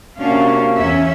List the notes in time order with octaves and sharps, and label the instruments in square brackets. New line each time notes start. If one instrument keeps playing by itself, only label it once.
[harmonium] C3 A#3 F#4 [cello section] C#4 D4 F5
[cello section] E2 C#4 E5